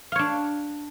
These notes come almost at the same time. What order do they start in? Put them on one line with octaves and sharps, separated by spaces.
F5 C#5 D4